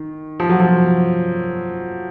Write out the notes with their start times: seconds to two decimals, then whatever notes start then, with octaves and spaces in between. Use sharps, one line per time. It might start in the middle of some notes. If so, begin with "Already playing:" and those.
Already playing: D#3
0.40 F3
0.49 F#3
0.60 F3